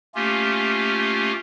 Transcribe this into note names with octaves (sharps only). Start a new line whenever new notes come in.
A3 A#3 C#4 F4 G4